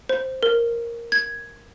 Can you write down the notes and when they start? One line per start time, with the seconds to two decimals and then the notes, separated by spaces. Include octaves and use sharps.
0.09 C5
0.43 A#4
1.12 G#6